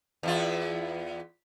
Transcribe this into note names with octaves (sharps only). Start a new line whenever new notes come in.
E2 E4 F4